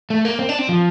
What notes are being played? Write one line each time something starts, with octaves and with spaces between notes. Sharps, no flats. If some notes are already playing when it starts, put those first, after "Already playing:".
A3
A#3
C4
D4
C4
F3